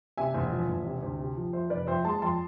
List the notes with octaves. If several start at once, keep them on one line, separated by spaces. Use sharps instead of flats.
C3 E5 G#5
E1
F3
E1
C3
D2
C3
F3
F2 C5 E5
F1 B4 D5
F2 C5 E5
G#3 A5 C6
F2 A5 C6